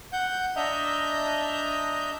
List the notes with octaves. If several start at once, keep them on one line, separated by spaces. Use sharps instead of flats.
F#5 G6
D4 D#5 E5 A#5 G6